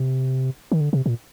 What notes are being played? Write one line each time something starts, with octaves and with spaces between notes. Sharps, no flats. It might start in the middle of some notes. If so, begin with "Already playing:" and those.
Already playing: C3
D#3
D3
C3
A#2